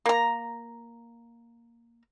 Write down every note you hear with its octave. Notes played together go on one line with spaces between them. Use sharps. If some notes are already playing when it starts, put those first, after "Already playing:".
A#3 A#5